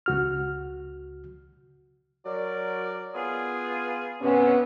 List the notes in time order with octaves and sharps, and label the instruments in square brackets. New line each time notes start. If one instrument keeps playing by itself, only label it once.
[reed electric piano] C#2 F#4 F6
[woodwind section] F#3 A#4 D5
B3 F4 G#4
[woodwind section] G2 C3 [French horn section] B3 C#4